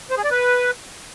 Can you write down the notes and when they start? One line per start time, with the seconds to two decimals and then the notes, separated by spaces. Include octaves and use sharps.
0.10 C5
0.17 G#4
0.24 D5
0.31 B4